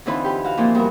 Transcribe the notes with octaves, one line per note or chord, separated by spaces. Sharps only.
D3 E3 C4 D#4 F4 B4
G4 B4
F#4 F5
A#2 E3 F3 A#3 C4
G2 B3 F#4 A#4